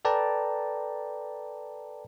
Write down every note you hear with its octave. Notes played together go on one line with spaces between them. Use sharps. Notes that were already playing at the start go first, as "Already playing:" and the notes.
A4 B4 D5 G5 A5 A#5